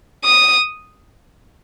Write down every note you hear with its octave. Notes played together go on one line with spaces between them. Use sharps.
D#6